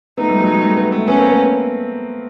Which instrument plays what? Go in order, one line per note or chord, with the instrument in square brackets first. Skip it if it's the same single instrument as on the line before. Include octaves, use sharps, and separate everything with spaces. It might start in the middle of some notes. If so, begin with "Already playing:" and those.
[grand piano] A3 B3 [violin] D#4
[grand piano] G3 A3
F#3 G#3
F#3 G#3
G3 A3
A3 B3
A3 B3
[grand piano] A3 B3 [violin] C#4
[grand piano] A#3 C4
A3 B3